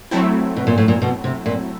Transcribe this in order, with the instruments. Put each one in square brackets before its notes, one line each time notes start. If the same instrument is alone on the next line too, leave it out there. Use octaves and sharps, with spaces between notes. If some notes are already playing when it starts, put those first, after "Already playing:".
[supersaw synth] F#3 A3 C4 E4
[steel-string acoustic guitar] B2
A#2
A2
A#2
B2
C3
A#2